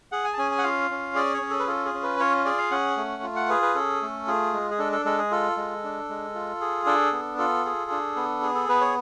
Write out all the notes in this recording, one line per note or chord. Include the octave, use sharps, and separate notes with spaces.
G#4 F#5
G#5
A5
C#4 G#5
G#5
F#5
F4 F5
C#4
G#4 D5
C#5
C#4
A4
B4
F4 A4
G#4
C#4
B4
F4 C#5
G#4 D5
F5
C#4 F#5
A3
F4
F#5
G#4 B4
B4
C#4 A4
A3
F4 G#4
G#3
G#4
D4 A4
A4
G#3 A4
G#4
F4 A4
G#3
D4
G#3
F4
G#4
D4 A4
B3
F4 A4
G#4
D4
B3
G#4
A4
B3 B4
C#5